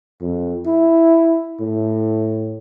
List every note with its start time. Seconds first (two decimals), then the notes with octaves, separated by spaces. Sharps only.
0.21 F2
0.66 E4
1.61 A2